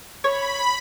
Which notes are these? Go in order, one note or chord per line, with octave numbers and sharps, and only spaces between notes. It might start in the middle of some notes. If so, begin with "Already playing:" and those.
C#5 B5